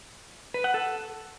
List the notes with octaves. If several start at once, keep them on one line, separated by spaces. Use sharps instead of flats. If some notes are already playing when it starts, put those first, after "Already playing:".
B4
F#5
A4